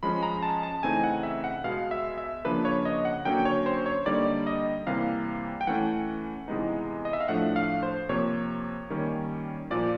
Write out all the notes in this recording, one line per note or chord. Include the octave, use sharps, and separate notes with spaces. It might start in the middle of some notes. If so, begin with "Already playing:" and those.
F3 G#3 C#4 B5
A#5
A5
A5
C#3 E3 A3 C4 D#4 G#5
F#5
E5
F#5
B2 G#3 B3 F5
E5
E5
C#3 F3 A#3 D4 B4
C#5
D#5
F#5
D3 F#3 A#3 C#4 G5
C#5
C5
C#5
D3 G3 A#3 D#4 D5
D#5
C3 E3 G3 A#3 F5
G5
E3 A3 C#4 F#5
C3 E3 G#3 B3 D#4
D#5
E5
F5
A2 F3 A3 D4 F#5
F5
C5
C3 F3 A#3 C#5
D#3 G3 A#3 C#4
A#2 F3 A#3 D5